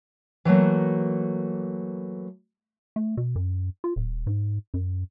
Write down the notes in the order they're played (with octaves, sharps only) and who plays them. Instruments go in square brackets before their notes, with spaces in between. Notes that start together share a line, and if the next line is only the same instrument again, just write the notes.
[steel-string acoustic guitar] E3 F#3 A3 A#3
[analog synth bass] A3
B2
F#2
F4
D#1
G#2
F#2